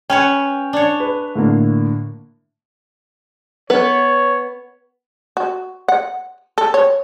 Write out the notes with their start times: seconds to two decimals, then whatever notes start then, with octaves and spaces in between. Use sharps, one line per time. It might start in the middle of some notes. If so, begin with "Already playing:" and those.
0.10 C#4 B4 C#5 G5
0.73 D4 C#5
1.00 B4
1.35 A2 D3 A#3
3.70 B3 B4 C#5
5.37 F#4
5.88 F#5
6.58 A4
6.74 C#5